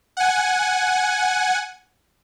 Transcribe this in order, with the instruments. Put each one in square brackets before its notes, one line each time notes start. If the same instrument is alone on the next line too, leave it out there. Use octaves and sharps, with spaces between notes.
[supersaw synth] F#5 G#5